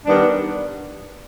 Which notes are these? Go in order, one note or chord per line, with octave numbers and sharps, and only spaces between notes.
D#3 G3 B3 D4